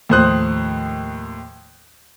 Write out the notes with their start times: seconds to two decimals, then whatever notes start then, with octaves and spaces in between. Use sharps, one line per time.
0.09 D#2 A2 F3 C5 D#6 F#6